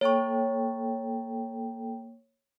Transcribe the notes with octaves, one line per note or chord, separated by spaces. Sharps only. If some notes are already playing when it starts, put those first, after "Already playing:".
A#3 A4 C#5 G5 C#6